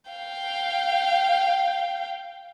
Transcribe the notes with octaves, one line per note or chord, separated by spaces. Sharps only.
F5 G5